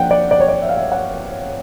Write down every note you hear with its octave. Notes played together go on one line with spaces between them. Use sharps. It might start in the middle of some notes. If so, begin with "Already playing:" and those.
Already playing: F3 A#3 D4 F#5 G5
D5
D5
C#5
D5
E5
F5
E5
F#5